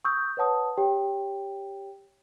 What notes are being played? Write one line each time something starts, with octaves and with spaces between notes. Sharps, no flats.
C#6 D#6 E6 G6
B4 C#5 F#5 A5 D#6
G4 C#5 G5